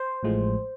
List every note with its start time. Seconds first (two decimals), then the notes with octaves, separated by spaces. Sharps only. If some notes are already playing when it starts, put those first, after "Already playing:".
Already playing: C5
0.23 A1 A2 F3 G#3